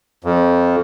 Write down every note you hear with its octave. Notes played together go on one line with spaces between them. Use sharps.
F2